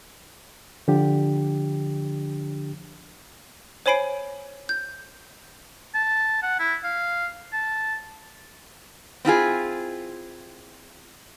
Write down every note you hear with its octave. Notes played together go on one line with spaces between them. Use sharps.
D3 F3 D4 G4
C5 C#5 G#5 B5 C7 D7
G6
A5
F#5
E4
F5
A5
C4 E4 F4 G#4